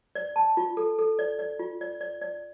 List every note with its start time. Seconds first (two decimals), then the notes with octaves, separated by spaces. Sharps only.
0.15 D5
0.36 A5
0.57 F4
0.77 A4
0.99 A4
1.19 D5
1.39 D5
1.59 F4
1.81 D5
2.01 D5
2.21 D5